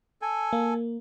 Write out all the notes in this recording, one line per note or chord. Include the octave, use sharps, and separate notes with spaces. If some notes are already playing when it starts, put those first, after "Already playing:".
A4 G#5
A#3